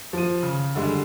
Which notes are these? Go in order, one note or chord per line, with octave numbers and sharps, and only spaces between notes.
F3 D#7
C#3
D3 G3 G#3